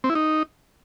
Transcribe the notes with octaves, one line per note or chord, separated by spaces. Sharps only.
C4
E4
D#4